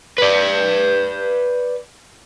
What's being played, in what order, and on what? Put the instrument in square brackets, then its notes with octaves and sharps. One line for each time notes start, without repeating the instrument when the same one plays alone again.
[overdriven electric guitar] B4 D5